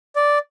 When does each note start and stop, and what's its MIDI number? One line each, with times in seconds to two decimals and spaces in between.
0.16 0.38 74